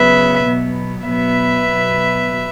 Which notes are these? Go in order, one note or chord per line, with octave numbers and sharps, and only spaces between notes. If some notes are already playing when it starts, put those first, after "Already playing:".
Already playing: C#3 F#3 B3 B4 E5
B2 F#3 B3
B2 F#3 B3 B4 E5
B2 F#3 B3